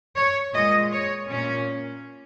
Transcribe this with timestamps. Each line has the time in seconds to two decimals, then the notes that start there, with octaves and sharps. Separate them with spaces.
0.16 C#5
0.54 A#2 G#3 D#5
0.92 C#5
1.30 A#2 A#3 C#4